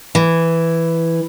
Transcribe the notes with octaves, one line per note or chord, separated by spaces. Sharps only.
E3